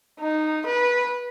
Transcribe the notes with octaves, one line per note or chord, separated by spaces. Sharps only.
D#4
B4